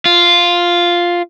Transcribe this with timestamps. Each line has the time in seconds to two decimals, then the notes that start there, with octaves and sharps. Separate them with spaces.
0.05 F4